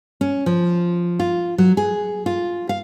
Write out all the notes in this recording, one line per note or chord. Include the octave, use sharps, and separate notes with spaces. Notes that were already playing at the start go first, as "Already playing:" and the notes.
C#4
F3
F4
F#3
G#4
F4
F5